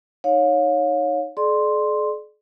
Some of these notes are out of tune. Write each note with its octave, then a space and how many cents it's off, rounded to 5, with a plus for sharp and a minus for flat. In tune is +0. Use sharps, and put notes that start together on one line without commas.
D#4 +0 C#5 +0 F5 +35
G#4 +45 D5 +25 C6 +0